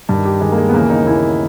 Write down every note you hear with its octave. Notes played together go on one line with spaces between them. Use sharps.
G2 D#3
G4
G2 D#3 G#3
A#3
G#3
B3
D#2 C#3 E3 A#3
D#4
D#2 C#3 E3 E4